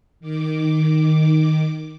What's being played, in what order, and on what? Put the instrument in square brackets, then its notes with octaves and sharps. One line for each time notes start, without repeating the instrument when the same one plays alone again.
[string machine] D#3 D6